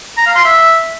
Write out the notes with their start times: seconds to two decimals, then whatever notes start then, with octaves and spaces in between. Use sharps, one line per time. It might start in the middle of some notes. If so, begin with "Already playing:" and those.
0.18 A#5
0.27 F5
0.36 C6
0.45 E5